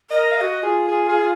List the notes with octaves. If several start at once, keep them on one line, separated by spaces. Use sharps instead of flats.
A#4 D#5
F5
F#4 A#4 D#5
F4 G#4
G#4
G#4